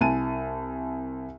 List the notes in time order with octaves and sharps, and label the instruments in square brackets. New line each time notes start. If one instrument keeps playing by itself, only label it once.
[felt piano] C2 G#5 A5 D#7